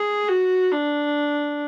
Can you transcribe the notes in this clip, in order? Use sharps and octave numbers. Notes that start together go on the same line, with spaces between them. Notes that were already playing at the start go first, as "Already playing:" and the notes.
Already playing: G#4
F#4
D4